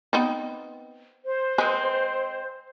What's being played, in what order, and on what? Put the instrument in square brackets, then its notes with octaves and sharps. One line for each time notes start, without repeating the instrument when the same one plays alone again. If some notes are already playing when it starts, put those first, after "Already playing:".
[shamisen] B3 C4 D#4
[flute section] C5
[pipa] G#3 C4 [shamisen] B4 G#5